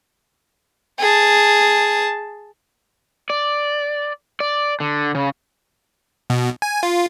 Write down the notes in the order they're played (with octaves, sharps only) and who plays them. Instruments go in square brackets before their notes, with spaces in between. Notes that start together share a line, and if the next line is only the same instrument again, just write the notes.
[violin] G#4 A5
[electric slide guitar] D5
D5
D3
C#3
[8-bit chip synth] B2
G#5
F4